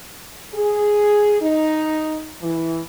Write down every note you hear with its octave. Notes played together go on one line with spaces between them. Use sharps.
G#4
D#4
E3